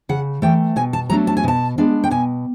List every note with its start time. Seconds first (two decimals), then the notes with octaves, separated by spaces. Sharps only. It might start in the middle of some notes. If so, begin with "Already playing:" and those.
0.09 C#3 F#5
0.42 E3 A3 G5
0.76 B2 G#5
0.93 A5
1.10 F#3 A3 D4 A#5
1.27 A5
1.37 G#5
1.44 B2 A5
1.78 G#3 B3 D4
2.04 G5
2.11 B2 G#5